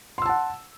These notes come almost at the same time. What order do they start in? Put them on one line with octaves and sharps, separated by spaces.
C6 E6 A5 F#5